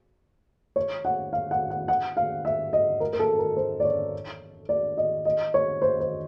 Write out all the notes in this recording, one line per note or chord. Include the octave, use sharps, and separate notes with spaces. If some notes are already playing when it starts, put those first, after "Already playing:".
C#5
F#5
F5
F#5
F#5
F#5
F5
E5
D#5
A#4
A#4
A4
A#4
C5
D5
C#5
D5
D#5
D#5
C#5
C5
C5